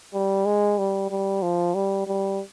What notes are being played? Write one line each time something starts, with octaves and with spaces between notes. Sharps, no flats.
G3
G#3
G3
G3
F3
G3
G3